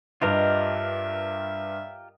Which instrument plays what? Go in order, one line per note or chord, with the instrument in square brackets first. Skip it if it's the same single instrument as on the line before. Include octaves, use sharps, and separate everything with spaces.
[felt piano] G2 B4 F6 [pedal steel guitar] F4 G4 A#4 [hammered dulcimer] D#5 [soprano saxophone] E5